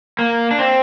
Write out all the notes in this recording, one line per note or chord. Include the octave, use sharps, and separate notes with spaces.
A#3
D4
C4